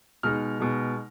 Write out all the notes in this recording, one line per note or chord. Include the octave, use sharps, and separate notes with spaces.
B2 G#3 D#4 F6
B2 G#3 D#4